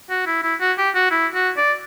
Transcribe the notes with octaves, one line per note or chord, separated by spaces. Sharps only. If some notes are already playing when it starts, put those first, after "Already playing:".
F#4
E4
E4
F#4
G4
F#4
E4
F#4
D5